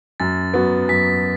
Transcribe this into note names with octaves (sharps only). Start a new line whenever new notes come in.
F#2 A6
F#3 B3 F#4
F#2 B6